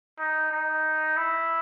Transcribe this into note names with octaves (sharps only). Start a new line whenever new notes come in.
D#4
D#4
E4